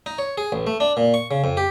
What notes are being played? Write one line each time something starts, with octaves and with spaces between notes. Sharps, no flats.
D#4
C#5
G#4
A1
A3
D4
A#2
C#6
C#3
F2
G4